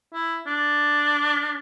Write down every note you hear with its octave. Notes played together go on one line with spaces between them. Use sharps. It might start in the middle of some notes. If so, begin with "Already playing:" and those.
E4
D4